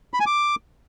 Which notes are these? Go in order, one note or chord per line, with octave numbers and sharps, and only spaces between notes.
B5
G#5
D6